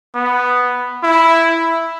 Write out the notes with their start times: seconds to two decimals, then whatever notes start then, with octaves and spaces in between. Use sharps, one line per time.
0.15 B3
1.03 E4